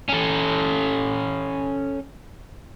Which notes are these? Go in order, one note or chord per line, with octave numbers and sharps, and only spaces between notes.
C#4 A4